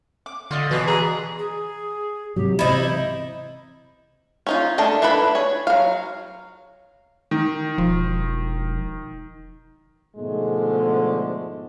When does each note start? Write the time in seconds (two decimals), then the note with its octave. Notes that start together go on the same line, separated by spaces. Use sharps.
0.26 D6
0.51 D3 F4 D5 D#5
0.71 B2 E3
0.87 G#4 A#5 B5
1.39 G#4
2.36 G#2 C3 F#3 G4
2.59 C3 E3 D#4 E4 C5
4.47 C#4 D#4 F4
4.78 A3 D4 A4 A#4 D#5
5.02 D4 E4 A4 B4 B5
5.35 G#4 C#5
5.67 F#3 F5
7.31 D#3
7.78 E1 F3
10.17 G#2 B2 D3 F3 G#3 A3